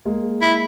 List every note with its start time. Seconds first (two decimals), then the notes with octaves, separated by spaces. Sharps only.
0.05 G#3 A#3
0.42 E4